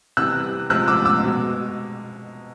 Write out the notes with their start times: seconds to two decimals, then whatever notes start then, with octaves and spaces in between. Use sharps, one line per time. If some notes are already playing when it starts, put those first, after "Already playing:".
0.17 C3 E3 G3 E6 F#6
0.70 C3 F3 G#3 E6 F#6
0.88 D6 E6
1.05 D6 E6
1.23 B2 G#3